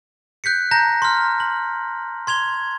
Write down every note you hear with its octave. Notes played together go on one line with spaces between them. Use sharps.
F#6 G6 B6 C#7
A5 A#5 G6 A#6
C6 F6
F#7
C6 G#6 F7 G7